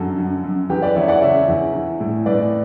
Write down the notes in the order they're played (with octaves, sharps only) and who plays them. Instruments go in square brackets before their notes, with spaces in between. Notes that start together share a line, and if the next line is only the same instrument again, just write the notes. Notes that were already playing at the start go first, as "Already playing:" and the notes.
Already playing: [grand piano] F#2 D3 F#4 A4
F#2
F#2
E2 G4 B4
B4 D5
E2 C#5 E5
D5 F#5
C#3 C#5 E5
E2
E3
A2
A2 B4 D5